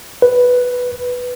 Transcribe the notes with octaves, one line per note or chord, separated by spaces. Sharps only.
B4